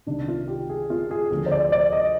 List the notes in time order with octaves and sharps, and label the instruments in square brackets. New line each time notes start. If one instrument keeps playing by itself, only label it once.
[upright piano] C2 C3 D#3 D4
F4
G4
G#4
F4
G#4
D2 D3 F3 G#4
C5
D5
D5
D#5